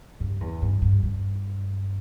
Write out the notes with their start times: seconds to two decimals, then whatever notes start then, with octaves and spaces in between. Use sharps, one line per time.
0.20 G2
0.41 E2
0.62 G2
0.82 G2
1.03 G2